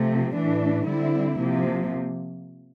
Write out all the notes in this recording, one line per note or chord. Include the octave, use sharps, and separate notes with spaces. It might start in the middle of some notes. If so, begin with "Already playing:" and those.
Already playing: C3 F3 A3
A2 E3 A3 D4
D3 G3 C4 E4
C3 F3 A#3